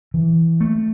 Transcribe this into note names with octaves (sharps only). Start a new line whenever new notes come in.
E3
A3